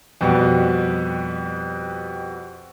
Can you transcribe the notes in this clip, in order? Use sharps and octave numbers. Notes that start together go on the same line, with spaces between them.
F2 B2 G3